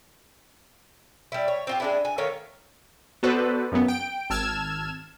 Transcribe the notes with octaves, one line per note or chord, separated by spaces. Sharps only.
G3 E4
C#5
C4 F4 G4
G#3 D4 E4
G#5
D#3 A3 C#5 F5
B3 F#4 A4 B4 C5 D5
F#2 C#3 F#3 B3
G5 D7
G#1 A5 E6 F6 G#6 E7